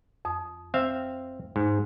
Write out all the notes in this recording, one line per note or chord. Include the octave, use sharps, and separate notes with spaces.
F2 D#6
C4 E5 F5
G#2